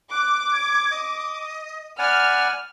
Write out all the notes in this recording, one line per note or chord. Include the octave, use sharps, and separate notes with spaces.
D6 F#6
G#6
D#5
D5 F#5 G#5 B5 F6